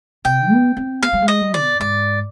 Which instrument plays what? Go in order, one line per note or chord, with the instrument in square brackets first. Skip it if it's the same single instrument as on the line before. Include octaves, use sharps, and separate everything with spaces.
[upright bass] C3 [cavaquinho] G5
[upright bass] B3
C4
[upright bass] B3 [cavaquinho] F5
[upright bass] G3
G#3
[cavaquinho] D#5
[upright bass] G3
[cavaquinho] D5
[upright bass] B2
[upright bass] G#2 [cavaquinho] D5